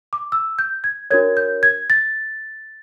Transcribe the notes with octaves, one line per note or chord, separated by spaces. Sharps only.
D6
E6
G6
G#6
D4 F#4 A#4 C#5 G#6
G6
G#6
A6